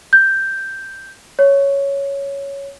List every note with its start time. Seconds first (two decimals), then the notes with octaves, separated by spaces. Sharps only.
0.13 G6
1.39 C#5